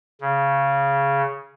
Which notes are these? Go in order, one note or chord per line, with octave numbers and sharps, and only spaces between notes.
C#3